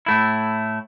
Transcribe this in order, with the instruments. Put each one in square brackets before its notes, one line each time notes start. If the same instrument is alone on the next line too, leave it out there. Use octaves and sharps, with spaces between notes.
[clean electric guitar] A2 A3 E4